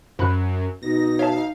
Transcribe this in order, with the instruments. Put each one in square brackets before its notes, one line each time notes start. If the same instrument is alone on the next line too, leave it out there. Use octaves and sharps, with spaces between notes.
[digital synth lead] F#2 [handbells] C5 B5 F#6
[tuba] B2 [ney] D#4 [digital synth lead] A#6
[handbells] C#5 E5 A5 [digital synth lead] F5